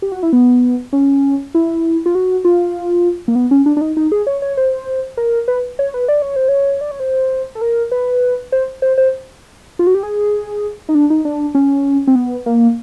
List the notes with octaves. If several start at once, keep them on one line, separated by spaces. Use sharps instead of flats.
G4
F#4
E4
B3
C#4
E4
F4
F#4
F4
A#3
B3
C#4
D4
D4
D#4
D#4
G#4
C#5
C#5
C5
A#4
B4
C#5
B4
D5
C#5
C5
C#5
D5
C#5
C5
A4
A#4
B4
C5
C5
C5
F4
F#4
G4
G#4
D#4
D4
D#4
D4
C#4
C4
B3
A#3